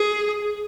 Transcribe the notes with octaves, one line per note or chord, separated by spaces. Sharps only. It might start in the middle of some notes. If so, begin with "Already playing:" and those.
Already playing: G#4